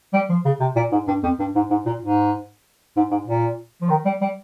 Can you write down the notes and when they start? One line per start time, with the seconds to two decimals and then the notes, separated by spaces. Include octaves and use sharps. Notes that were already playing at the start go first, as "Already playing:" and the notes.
0.14 G3
0.29 F3
0.45 C#3
0.60 C3
0.76 A#2
0.92 G#2
1.07 G2
1.23 F2
1.39 G2
1.55 G#2
1.71 G#2
1.86 A#2
2.02 G#2
2.96 G#2
3.11 G#2
3.27 A#2
3.81 F3
3.90 D#3
4.05 G3
4.21 G3